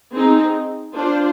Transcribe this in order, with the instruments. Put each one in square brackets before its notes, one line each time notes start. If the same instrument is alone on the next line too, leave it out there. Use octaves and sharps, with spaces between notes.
[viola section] C4 D#4 G#4
D4 F4 C5